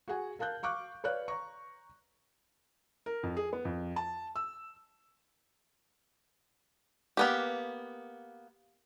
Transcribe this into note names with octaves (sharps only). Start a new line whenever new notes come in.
F#4 G#4 F#5 G#5
A#4 F5 A5 F#6 G6
F5 C#6 D6 F#6
B4 C#5 D5 F5 F#6
A#5 C#6
A#4
F2
G#4
B3
F2
A5
E6
A#3 B3 G4